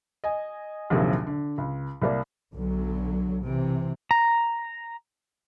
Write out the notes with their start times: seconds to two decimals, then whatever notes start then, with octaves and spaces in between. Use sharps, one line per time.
0.24 D#5 G#5
0.90 A#1 D#2 C3 F#3 A#3 G#4
1.27 D3
1.58 C#2
2.02 C2 A#3 D5
2.53 B1 D3 F#3
3.43 C3 E3
4.11 A#5